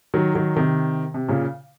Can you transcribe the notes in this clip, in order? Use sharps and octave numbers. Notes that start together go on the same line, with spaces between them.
D#3 F#3
D#3 F#3
C3 D#3
C3
A#2 C#3